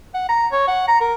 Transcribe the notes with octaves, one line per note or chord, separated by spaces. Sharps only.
F#5
A#5
C#5
F#5
A#5
A#4